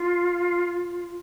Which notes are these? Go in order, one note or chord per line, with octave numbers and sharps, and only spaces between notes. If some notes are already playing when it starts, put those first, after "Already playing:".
Already playing: F4